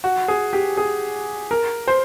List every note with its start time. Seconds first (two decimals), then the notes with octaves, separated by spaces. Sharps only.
0.04 F#4
0.28 G#4
0.53 G4
0.77 G#4
1.51 A#4
1.88 C5